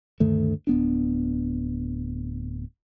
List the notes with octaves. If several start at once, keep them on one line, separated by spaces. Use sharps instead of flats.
D2 G2 D#3 A3
D1 B3 D4